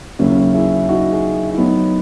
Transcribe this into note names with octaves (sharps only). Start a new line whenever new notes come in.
D#2 C#3 F#3 C#4 E4
E4 G#4
D#4 F#4
E4 G#4
E4
A2 F#3 B3 D#4